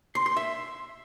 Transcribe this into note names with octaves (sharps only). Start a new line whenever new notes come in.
C6
C6
E5